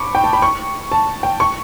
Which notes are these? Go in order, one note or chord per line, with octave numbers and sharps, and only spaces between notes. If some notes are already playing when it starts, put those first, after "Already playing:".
Already playing: B5 C#6 D6
G5
A5
B5
C#6
A5
G5
C#6